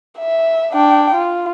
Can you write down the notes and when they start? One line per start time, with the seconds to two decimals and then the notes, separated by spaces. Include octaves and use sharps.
0.19 E5
0.73 D4 G5
1.15 F4